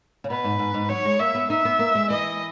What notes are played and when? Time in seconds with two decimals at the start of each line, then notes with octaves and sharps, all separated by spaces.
0.24 C#3
0.30 B2 B4
0.44 G#2
0.59 G#2
0.74 G#2
0.89 F#3 C#5
1.05 G#3
1.19 A#3 E5
1.35 B3
1.50 D#4 E5
1.65 B3
1.79 A#3
1.95 G#3
2.10 E3 D#5